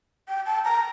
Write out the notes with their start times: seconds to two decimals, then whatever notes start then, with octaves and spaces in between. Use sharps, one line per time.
0.28 G5
0.46 A5
0.65 A#5